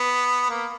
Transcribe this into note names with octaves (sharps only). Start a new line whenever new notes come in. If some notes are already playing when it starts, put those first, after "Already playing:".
Already playing: B3
A#3